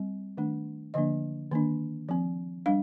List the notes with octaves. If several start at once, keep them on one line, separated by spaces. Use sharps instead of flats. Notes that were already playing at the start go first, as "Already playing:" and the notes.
Already playing: G3 C4
D#3 A3 D4
D3 F3 A#3 D4 D#5
D#3 A#3 D4
F3 C4
G3 D4 F5